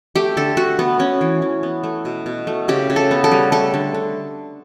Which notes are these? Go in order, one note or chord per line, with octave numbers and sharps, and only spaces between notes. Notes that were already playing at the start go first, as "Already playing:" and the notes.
A3 G4
D3 A4
D3 F#4
A3 B3
B3 C#4
E3
E3
B3
A3
B2
B2
A3
C#3 G4
C#3
A4
B3
A4
G3
A3 A4
D3
D3